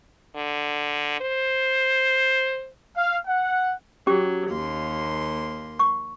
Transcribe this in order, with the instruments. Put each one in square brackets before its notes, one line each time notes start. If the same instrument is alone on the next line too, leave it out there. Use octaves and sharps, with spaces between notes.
[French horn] D3
C5
[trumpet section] F5
F#5
[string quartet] F#3 [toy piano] C#4 G4 D6
[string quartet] D#2 A#3 C6
[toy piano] C#6